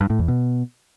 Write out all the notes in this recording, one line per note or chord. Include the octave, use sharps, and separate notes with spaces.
G2
A2
E2
B2